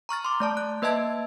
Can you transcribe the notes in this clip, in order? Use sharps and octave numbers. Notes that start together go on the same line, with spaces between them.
A#5 C#6 F6 A6
C6 D6
A3 D5 A5
F#6
A#3 B4 D#5 E5 A5 G#6